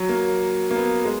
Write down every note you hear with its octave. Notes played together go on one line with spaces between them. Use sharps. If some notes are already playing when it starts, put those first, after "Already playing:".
Already playing: F#3
A#3
A#3
B3
G#3